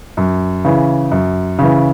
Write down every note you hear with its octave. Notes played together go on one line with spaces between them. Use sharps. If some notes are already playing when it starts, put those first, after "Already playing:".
F#2
C#3 E3
F#2
C#3 E3